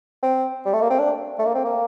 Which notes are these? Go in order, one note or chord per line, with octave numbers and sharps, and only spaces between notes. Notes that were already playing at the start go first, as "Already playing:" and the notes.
C4
G3
A3
A#3
C4
D4
A3
A#3
C4
A#3